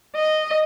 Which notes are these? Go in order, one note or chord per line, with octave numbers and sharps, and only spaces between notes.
D#5